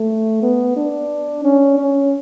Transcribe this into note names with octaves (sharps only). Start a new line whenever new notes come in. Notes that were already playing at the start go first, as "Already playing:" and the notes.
Already playing: A3
B3
D4
C#4
C#4